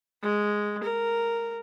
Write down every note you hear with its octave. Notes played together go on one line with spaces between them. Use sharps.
G#3
A#4